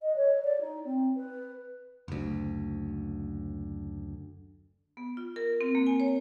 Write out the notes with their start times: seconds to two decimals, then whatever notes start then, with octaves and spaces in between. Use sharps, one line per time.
0.01 D#5
0.15 C#5
0.44 D5
0.60 D#4
0.85 C4
1.15 B4
2.08 F#1 D2
4.97 B3
5.17 F4
5.36 A#4
5.61 C4
5.75 A#3
5.87 G#5
6.00 C#5